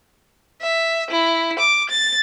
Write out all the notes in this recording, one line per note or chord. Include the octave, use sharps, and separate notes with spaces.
E5
E4
D6
A6